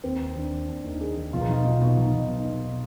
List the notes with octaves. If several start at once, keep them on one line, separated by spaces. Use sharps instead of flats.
D#2 C4
D#2
D#3 D4
D#3
D#2 D4
D#2 D#4
D#3 G#4
D#3
B1 F4
D#4
B1 F4
B2
B2
B1 D#4
B1
B2
B2